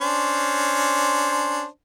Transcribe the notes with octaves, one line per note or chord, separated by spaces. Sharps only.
C#4 D4 C5